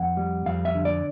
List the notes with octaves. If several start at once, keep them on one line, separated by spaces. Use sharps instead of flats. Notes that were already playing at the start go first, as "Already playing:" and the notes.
Already playing: F2 F#5
G3
F2 F5
E5
D3
D5